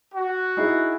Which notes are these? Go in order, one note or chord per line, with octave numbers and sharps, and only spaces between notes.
F#4
D#4 E4 G#4